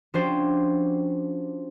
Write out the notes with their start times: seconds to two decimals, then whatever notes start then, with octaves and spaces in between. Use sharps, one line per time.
0.14 F3 C#4 D4 F#4 G4 C5